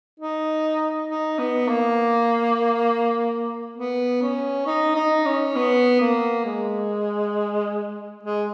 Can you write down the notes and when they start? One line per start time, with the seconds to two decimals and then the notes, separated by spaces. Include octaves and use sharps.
0.20 D#4
1.09 D#4
1.39 B3
1.68 A#3
3.77 B3
4.22 C#4
4.66 D#4
4.96 D#4
5.25 C#4
5.56 B3
6.00 A#3
6.45 G#3
8.23 G#3